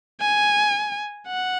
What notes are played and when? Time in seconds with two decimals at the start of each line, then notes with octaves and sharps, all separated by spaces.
0.21 G#5
1.28 F#5